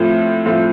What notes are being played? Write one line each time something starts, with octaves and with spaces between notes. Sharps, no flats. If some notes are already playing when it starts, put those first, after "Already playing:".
Already playing: A2 F3 A3 C4 F4
A2 F3 A3 C4 F4